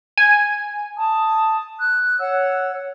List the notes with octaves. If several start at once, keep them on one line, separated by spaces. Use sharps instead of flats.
G#5
A5 D#6
F#6
C#5 F#5 E6